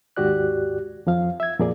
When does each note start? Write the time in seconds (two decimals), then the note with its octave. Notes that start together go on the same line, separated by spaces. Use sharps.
0.17 D#2 G#2 F#4 G4 D5 F#6
1.07 F2 F3 F5
1.40 E5 G#6
1.59 F2 A#2 A#3 G#4 D5